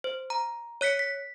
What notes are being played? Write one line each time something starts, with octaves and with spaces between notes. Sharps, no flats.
C5
A#5
C#5 F#6 B6 C#7
B6